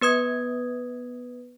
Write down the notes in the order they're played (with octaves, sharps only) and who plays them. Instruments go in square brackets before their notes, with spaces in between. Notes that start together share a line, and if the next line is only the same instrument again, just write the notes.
[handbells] B3 B4 D#6 G#6